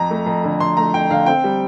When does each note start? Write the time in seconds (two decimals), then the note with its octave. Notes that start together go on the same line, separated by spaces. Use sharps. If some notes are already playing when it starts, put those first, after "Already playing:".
Already playing: F2 A#5
0.11 A3
0.26 F2
0.44 D3
0.60 F2 C6
0.77 A3 A#5
0.93 F2 G5
1.10 D3 F5
1.26 C4 G5
1.44 G3